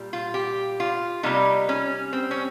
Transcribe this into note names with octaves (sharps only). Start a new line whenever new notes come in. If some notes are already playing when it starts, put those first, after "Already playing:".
Already playing: A#2 G3
F4
G4
F4
C3 G3 A#3 D#4
C#4
C4
C#4